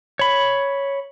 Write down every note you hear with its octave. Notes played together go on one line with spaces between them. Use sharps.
C#5 B5